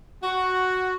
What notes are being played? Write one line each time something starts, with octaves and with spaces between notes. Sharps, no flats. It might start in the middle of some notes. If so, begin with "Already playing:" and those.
F#4